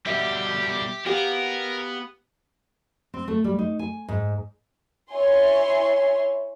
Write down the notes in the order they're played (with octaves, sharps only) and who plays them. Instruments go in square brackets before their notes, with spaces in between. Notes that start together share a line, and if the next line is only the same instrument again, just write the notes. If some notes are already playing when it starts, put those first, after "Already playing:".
[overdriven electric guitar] B2 G3 [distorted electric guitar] G4 [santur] E5
[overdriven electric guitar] B3 [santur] G4 F5 [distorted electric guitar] A#4
[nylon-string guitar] C4
A3
G3
D#4
G#5
G#2
[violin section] E4 C#5 E5 G#5 C6